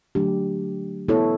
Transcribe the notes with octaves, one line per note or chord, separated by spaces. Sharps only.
D3 F#3 A3 D4 G4
B3 E4 A4 C#5